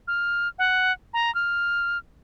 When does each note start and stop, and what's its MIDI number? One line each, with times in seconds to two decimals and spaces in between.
0.08 0.48 89
0.59 0.92 78
1.14 1.33 82
1.35 1.98 89